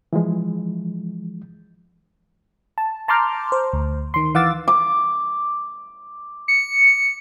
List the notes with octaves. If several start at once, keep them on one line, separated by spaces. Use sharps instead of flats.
E3 F3 G#3
A5
A5 A#5 C6 D6 F6 G6
C5
D2
D#3 C6
E3 F5 F#5 D6 E6 A6
D6
C#7